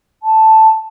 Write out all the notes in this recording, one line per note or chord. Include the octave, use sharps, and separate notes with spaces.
A5